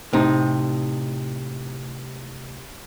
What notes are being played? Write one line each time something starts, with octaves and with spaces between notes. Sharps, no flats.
A2 C3 D#4